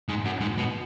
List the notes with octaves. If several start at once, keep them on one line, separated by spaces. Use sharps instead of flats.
G#2
F#2
G#2
B2